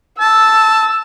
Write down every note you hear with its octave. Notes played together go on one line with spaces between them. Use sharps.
A5 E6